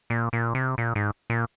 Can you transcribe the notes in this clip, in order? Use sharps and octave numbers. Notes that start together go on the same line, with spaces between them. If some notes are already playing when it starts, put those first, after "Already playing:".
A#2
A#2
C3
A#2
G#2
A#2